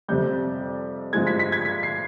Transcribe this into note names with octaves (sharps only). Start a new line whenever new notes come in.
F2 C3 G3 G6
G2 F3 G#3 G#6
B6
B6
G#6
B6
C7